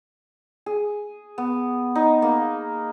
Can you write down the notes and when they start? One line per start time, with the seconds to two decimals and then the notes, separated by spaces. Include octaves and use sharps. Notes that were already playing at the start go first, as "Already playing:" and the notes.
0.66 G#4
1.38 B3
1.95 D#4
2.22 A#3